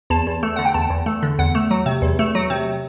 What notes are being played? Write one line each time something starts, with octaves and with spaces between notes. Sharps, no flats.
E2 A5
E2
A3
D3 F#5
G5
E2 A5
E2
A3
D3
E2 F#5
A3
F#3
C3
E2
A3
F#3
C3